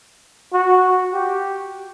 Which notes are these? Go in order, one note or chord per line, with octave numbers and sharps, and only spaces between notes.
F#4
G4